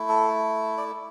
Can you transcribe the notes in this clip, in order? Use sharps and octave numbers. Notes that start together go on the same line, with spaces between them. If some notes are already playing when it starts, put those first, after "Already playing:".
Already playing: A3 E4
A4
D5